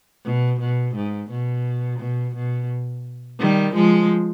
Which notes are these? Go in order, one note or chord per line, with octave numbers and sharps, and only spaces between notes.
B2
B2
G#2
B2
B2
B2
D#3 G3
F3 G#3